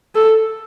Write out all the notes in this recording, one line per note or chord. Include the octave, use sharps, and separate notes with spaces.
A4